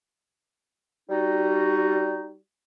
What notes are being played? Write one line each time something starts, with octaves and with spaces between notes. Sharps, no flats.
G3 D#4 F#4